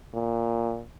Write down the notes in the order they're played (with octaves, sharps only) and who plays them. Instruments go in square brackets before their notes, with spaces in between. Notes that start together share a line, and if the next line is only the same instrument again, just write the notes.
[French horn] A#2